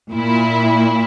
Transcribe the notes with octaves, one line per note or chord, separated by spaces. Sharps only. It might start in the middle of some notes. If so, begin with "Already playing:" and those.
A#2 E4